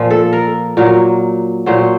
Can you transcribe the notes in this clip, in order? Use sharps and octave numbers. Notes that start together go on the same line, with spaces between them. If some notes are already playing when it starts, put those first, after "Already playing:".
Already playing: A#2 F3
A4
A#4
A#2 F#3 A#4
A#2 F#3 C5